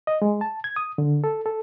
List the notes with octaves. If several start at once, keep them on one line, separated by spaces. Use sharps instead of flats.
D#5
G#3
A5
G#6
D#6
D3
A4
A4